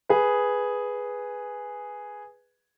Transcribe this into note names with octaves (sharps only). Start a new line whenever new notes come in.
G#4 B4